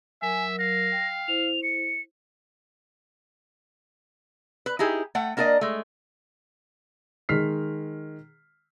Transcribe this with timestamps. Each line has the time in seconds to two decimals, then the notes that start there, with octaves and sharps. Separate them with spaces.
0.22 F#3 A#4 E5 G#5
0.59 F5 A#6
0.92 G5
1.28 E4 C5 F7
1.63 C#7
4.66 B4
4.79 D#4 E4 G4 G#4
5.15 A3 F#5 G5
5.37 A#3 D4 A#4 D5 D#5
5.61 G#3 A3
7.29 D#3 G#3 F6 B6 C7